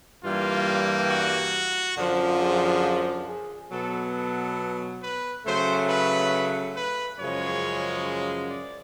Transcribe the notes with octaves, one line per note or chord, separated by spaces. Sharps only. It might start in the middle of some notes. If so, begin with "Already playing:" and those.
G2 E3 G3 A#3 F4
F#4
F#2 D3 F3
G#4
G#4
B2 F#3 B3 A4
A4
B4
C#3 F#3 A3 C5
B4
B4
F#2 C#3 F3 G#3 C#5
D5